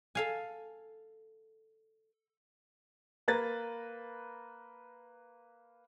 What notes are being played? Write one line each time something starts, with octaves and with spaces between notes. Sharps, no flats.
A4 F5 G#5
A#3 B4 A#5 A6